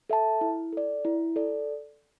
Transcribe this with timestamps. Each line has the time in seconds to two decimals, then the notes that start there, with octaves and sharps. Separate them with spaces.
0.10 A4 E5 A5
0.41 E4
0.73 A4 D5
1.05 E4
1.36 A4 D5